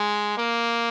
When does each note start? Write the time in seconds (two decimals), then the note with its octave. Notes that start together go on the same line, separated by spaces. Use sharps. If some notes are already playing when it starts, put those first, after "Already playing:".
Already playing: G#3
0.38 A#3